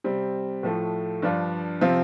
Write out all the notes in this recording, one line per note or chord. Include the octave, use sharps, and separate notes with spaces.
C3 G3 C4
A2 F3 A3
G2 F3 D4 F4
C3 F3 C4 F4